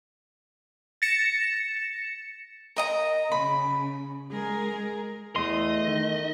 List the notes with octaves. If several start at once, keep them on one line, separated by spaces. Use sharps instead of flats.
A6 A#6 C#7 E7
A#4 D#5 A#5
C#3 B5
G#3 G#4 A#4
E2 A3 D#5 C6
D#3